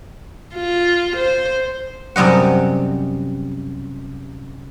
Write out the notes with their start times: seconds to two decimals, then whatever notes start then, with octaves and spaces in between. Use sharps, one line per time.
0.55 F4
1.17 C5
2.16 F#2 C3 G3 D#5 F#5